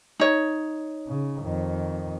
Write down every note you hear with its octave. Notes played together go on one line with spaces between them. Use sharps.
D#4 C#5
C#3
F2 D#3